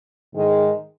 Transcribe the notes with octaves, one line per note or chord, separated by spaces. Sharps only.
G#2 D#3 G#3